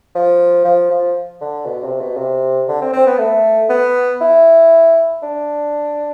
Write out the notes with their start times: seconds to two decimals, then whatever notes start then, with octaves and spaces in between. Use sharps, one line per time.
0.15 F3
0.65 F3
0.91 F3
1.41 D3
1.66 B2
1.84 C3
2.01 B2
2.17 C3
2.68 D3
2.82 C4
2.93 C4
3.07 B3
3.19 A3
3.69 B3
4.21 E4
5.23 D4